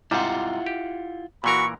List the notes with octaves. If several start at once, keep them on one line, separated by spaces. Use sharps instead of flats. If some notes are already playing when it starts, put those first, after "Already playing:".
G#2 C3 G3 E4 F4 F#5
G4
A#2 E3 F#4 A#4 B5 C#6